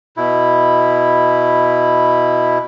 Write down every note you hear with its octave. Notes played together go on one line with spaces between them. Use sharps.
B2 E4